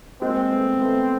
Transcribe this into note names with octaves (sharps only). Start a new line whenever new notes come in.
G#3 A#3 C4
A3 B3
A3 B3